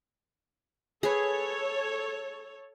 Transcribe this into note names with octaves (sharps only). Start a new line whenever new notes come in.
G#4 A4 B4 C#5